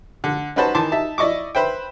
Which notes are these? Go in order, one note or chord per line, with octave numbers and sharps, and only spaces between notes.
D3
C#4 D#4 F#4 B4 C5 A5
D#3 E3 A5 C6 D6
D#4 E5 A5
E4 D5 D#5 C#6 D6
B4 C5 E5 G5